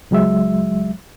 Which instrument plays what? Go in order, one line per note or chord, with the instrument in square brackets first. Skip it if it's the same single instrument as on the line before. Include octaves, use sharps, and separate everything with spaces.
[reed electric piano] C#2 F#3 G#3 E5